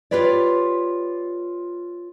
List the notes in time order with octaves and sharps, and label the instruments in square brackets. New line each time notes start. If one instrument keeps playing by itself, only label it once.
[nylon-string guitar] F4 G4 B4 C#5 D5